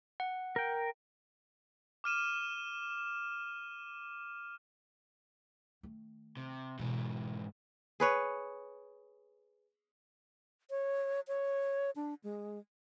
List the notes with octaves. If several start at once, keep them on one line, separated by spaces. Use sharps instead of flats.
F#5
A#4 G5
D6 F6 D#7 E7
D#3 A3
C3
G#2 B2 E3
G#4 B4 C#5
C#5
C#5
D4
G#3